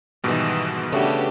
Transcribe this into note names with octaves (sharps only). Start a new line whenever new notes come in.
G#2 B2 D#3 E3 G3
C#3 A3 B3 D4 F#4 G4